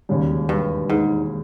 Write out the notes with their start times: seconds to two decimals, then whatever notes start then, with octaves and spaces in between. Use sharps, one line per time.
0.09 E1 D#2 C#3 G3
0.49 G2
0.90 G#2